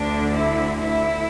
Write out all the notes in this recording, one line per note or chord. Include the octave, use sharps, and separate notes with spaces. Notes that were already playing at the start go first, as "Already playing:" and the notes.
Already playing: D2 D3 D4
E4
E4